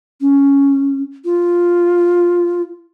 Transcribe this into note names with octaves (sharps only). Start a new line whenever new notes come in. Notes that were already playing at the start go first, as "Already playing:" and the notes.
C#4
F4